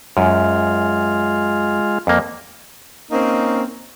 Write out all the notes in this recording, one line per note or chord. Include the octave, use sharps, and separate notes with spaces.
F#2 G#3 F4
F2 A#3
A#3 C4 C#4 D#4